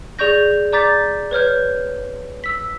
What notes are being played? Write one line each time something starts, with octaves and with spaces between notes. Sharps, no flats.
G#4 D5 C#6 G6 A#6
D5 A#5 D6 G6 A6 B6
B4 C#5 F6 G6
E6 B6